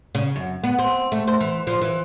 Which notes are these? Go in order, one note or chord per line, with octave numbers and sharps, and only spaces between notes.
C#3
F#2
B3
C4
A3
C5
E3
F3
E3